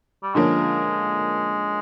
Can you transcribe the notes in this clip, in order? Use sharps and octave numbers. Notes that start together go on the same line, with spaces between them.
G3
D3 F3 G#3 A#3 C#4